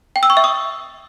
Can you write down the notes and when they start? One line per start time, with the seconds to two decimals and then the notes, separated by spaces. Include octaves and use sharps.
0.16 G5
0.23 E6
0.30 C#6
0.37 E5
0.44 D#6